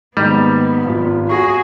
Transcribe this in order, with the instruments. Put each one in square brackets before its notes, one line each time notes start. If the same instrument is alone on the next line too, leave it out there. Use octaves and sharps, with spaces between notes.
[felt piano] G#2 D#3 D#4 [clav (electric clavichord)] G3 [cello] A#3 B3
[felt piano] G#1 F4
[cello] F#4 G#4 [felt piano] C#6 A#6